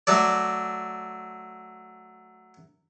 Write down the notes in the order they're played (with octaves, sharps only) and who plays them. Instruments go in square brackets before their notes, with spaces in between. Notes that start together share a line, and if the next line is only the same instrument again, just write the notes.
[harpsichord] F#3 A3 D5